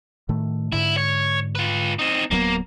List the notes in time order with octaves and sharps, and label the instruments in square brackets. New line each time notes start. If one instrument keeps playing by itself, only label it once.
[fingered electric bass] A2 D#3 A3
[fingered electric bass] G#2 D3 [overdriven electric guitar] E4
[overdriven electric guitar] C#5
F4 B4
C4 D#4
[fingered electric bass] D1 F#3 B3 [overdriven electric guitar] A#3